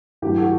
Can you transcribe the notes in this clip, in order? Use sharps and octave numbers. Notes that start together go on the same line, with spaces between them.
G2 F#3 A3 E4 G4
F#4 A4